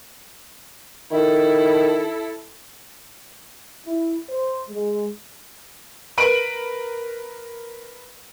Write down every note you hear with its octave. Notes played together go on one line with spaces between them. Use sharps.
D#3 E4 A4
E4
C5
G#3
A#4 B4 B5 D7 D#7 F#7